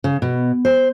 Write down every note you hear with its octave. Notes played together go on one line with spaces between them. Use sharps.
C#3
B2
C5